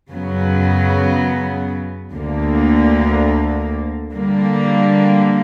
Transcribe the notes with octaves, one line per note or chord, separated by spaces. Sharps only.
F#2 C#3 F#3 B3
D2 D3 A#3
D3 G3 A#3